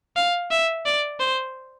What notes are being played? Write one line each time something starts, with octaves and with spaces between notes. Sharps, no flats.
F5
E5
D5
C5